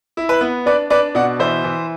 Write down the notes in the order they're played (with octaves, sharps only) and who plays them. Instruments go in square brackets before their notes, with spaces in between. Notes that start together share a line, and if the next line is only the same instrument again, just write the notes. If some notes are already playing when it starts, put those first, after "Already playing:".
[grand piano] E4
B4
B3
D4 B4 D5
D4 B4 D5
B2 D5 F#5
E3 C5 E5
E3